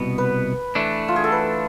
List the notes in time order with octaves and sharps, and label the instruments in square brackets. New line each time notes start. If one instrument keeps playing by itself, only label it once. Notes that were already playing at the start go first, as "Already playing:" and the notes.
Already playing: [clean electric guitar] C2 B2 B3
[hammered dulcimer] B4
[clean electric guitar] E3 A3 D4
[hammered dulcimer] F4
G#4
A4
B4